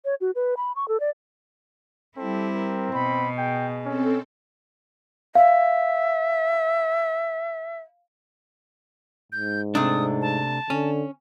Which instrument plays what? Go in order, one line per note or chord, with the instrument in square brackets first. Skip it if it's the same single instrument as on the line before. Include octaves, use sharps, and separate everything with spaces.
[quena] C#5
F#4
B4
B5
C#6
A4
D5
[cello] G3 E4 [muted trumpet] C4 [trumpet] A4
[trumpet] A#4
[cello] B2 [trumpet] B5
[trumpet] G#4 [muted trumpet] G5
[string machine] C4 A4 [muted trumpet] C#4
[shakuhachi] E5 [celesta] F5
[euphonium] G#2 [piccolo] G6
[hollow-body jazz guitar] C3 A3 D4 [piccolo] D#6
[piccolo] A5
[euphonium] D3 [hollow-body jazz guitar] C#4